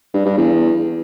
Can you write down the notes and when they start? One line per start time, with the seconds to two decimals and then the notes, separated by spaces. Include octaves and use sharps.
0.14 G2
0.26 G2
0.37 E2